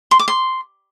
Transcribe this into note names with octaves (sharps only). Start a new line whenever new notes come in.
C6
D6
C6